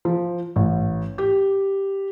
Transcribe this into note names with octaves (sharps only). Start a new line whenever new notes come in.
F3
A1
G4